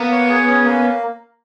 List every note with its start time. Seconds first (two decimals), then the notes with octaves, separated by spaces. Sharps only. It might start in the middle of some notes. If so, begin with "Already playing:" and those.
Already playing: A#3 B3
0.12 C#5
0.29 G#4
0.47 C#4
0.64 A#3